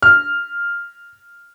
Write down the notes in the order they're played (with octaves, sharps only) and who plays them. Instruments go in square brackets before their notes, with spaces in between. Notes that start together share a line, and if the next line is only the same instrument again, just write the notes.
[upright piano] F6